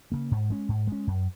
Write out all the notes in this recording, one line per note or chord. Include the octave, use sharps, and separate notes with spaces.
C#3 A#3
G#2
G#3 C#4
G#2
G#3 C#4
F#2